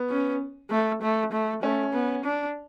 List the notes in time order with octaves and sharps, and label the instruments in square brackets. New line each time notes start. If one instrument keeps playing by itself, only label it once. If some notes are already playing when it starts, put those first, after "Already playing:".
Already playing: [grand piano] B3
[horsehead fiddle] C#4
A3
A3
A3
[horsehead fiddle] A3 [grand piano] C#4
[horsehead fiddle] B3
D4